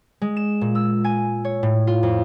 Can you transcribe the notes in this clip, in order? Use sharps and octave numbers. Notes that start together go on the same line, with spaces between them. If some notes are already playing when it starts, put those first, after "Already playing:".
G#3
E7
A#2
E6
G#5
C#5
A2
F4
F2